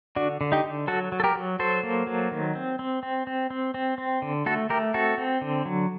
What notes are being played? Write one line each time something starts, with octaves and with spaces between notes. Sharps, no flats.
D3 D4 F#4
D3
D#4 G4
D3
F#3 F#4 A4
F#3
A4
G4 A#4
F#3
F#3 A4 C5
A#3
F#3
D#3
C4
C4
C4
C4
C4
C4
C4
D3
A3 F#4 A4
A3 G4 A#4
C4 F#4 A4
C4
D3
F#3